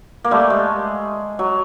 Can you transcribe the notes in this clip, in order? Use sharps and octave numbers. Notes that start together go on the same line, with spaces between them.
A#3
G3 A3
G#3
F#3